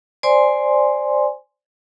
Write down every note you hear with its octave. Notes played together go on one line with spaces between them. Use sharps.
C5 D5 G#5 C6